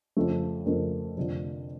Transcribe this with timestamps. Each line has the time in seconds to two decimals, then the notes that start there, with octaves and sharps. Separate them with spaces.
0.17 F2 C#3 F3 A3
0.66 F2 C#3 F3 A3 A#4
1.17 F1 F2 D3 F3